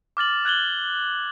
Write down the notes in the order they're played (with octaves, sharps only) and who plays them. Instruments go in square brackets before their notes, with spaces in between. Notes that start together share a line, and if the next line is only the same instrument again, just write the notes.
[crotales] D6 F6 A6 F#7
F#6 G#6 F#7 G7